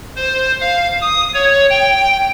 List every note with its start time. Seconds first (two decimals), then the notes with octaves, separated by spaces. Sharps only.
0.16 C5
0.61 F5
1.01 D#6
1.34 C#5
1.70 G5